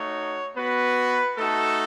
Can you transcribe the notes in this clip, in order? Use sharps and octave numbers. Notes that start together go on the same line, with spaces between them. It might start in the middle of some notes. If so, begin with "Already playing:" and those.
Already playing: A3 D#4 F#4 C#5
B3 F#4 B4
A3 D#4 F#4 A4